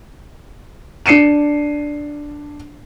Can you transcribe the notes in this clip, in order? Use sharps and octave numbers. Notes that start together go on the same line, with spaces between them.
D4 C7 C#7 D#7 E7